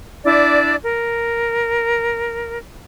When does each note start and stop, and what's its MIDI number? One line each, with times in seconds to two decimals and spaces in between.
0.25 0.76 62
0.25 0.76 64
0.25 0.76 74
0.25 0.76 86
0.82 2.59 70